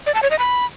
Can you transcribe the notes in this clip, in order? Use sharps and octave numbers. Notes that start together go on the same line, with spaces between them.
D5
A5
C#5
D#5
B5